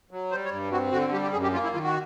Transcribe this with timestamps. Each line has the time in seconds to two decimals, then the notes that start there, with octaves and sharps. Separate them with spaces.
0.11 F#3
0.31 G3 C5
0.45 C#5
0.51 G2
0.72 C4 F#4
0.92 D3 F#4
1.12 G3 G4
1.22 G4
1.33 F#2 G#4
1.43 G4
1.53 A#3 F4
1.63 E4
1.74 D#3 F4
1.84 F#4